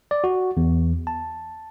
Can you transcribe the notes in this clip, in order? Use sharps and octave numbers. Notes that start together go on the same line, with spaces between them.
D5
F#4
E2
A5